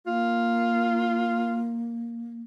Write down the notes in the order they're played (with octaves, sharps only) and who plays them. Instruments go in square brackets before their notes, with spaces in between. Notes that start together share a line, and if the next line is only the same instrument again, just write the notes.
[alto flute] A#3 [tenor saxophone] F4